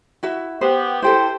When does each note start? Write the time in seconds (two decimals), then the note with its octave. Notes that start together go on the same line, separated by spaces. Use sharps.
0.23 E4 F#4 E5
0.61 B3 G4 C5
1.02 E4 G4 A4 C5